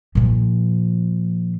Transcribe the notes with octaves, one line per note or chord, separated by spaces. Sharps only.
A#2 F3